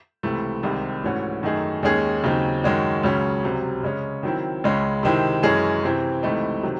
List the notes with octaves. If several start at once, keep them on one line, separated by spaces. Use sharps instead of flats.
C#2 C3 E3 A3
C2 C3 D#3 G#3
G#2 E3 A3 C#4 F#4
F#2 D#3 A3 D#4 G#4
D#2 D#3 G#3 C#4 G#4
D#2 C#3 F#3 C4 D#4
F#2 D#3 G#3 C#4 F#4
C#2 C#3 F#3 C#4
C2 C3 F#3
C#3 G#3 C#4
D#3 F#3 C4 E4
C#2 C#3 G#3 C#4
C3 D#3 G#3 C4 E4
F#2 E3 G#3 C#4 G#4
C3 E3 C4 E4
C#2 C3 E3 A3 D#4
C3 D#3 F#3